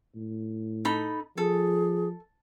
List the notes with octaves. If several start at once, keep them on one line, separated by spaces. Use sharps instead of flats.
A2
D#4 A4 B5
F3 G#4 A4